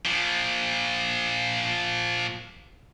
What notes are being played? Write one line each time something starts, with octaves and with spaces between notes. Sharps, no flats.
A#2 F3